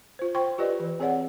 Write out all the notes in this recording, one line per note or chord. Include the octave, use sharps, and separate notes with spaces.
F4 C5
C5 G5 C6 C#6
F4 G4 B4 D5 D#5
E3
C4 G#4 C#5 D5 F#5